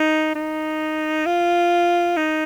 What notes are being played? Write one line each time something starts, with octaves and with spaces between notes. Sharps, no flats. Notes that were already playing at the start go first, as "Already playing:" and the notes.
Already playing: D#4
D#4
F4
D#4